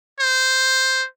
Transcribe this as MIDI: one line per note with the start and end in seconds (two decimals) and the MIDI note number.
0.20 1.05 72